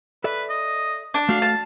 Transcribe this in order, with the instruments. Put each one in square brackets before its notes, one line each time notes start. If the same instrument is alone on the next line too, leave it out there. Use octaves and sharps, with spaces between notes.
[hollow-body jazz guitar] A4 D5 E5 [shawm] B4
[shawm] D#5
[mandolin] D4
[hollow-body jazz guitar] A3 F#4 [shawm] F5
[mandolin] A5